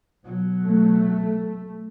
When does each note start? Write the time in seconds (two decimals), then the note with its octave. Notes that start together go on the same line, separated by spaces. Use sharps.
0.24 B2 F#3
0.65 A3